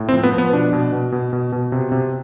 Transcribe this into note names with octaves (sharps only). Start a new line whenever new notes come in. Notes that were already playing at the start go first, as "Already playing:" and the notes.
Already playing: A2
C4
F3
B3
F3
B3
B2 D4
B2
B2
B2
B2
B2
C3
C3